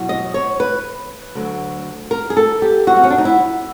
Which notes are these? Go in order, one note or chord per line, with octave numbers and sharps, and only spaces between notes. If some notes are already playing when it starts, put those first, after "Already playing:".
Already playing: E2 B2 F#3
D#5
C#5
B4
D2 D3 F#3
A#4
G#4
A4
G4
F#2 D3 F3 F#4
C4
C#4
D4
D#4
E4